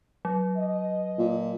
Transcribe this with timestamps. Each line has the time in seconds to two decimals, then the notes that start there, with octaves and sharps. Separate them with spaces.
0.25 F#3
0.57 D#5
1.18 A#2